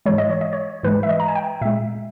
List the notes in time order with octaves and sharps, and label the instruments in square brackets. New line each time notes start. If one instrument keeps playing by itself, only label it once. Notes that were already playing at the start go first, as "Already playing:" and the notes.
[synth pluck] G#2 E3 G#3 C#5
D#5
C#5
D#5
C#5
G#2 E3 G#3 B4
E5
D#5
A#5
G#5
G5
A#2 G#3 E5